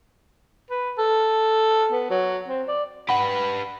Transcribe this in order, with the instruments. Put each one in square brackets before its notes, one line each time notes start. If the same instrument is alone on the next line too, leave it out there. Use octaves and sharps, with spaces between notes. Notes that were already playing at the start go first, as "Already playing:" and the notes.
[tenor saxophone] B4
A4
B3
F#3
C4
D5
[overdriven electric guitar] G4 B4 [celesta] F#5 B5